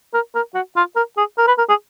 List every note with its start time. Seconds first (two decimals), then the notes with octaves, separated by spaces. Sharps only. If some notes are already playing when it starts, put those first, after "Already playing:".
0.14 A#4
0.35 A#4
0.55 F#4
0.76 F4
0.96 A#4
1.18 G#4
1.38 A#4
1.48 B4
1.58 A#4
1.69 G#4